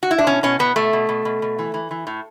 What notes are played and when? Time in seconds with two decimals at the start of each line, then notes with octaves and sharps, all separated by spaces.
0.03 F#4
0.11 E4
0.18 D4
0.27 B2 C#4
0.43 B2 C#4
0.59 B2 B3
0.76 B2 A3
0.93 B2
1.09 B2
1.25 B2
1.42 B2
1.59 E3
1.74 E3
1.91 E3
2.07 A2